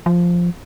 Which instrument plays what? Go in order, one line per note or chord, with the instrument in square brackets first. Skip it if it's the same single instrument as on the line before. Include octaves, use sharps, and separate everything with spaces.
[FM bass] F3